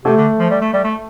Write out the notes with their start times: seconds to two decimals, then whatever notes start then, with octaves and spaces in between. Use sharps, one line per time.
0.05 C3 A3
0.16 D3
0.39 F3
0.50 G3
0.61 A3
0.73 G3
0.84 A3